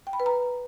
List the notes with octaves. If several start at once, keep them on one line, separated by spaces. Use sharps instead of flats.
G5
B5
B4
A#5